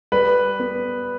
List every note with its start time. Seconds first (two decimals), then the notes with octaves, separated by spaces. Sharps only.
0.12 G3 B4
0.59 B3